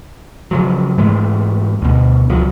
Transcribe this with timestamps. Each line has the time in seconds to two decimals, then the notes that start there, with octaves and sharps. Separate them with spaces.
0.51 C#3 F3 F#3
0.98 G#2 E3 G#3 A3
1.82 D2 B2
2.29 C#2 F3 F#3